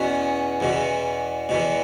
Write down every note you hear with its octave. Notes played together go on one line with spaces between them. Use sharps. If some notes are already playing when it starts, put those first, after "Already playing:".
Already playing: E2 B2 B3 C#4
E2 B2
E2 B2